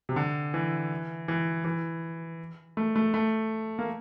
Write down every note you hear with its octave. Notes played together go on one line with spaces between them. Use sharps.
C3
D3
E3
E3
E3
A3
A3
A3
A#3